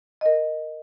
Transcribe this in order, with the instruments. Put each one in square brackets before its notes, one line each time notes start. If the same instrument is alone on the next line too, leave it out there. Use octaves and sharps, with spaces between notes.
[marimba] A#4 D#5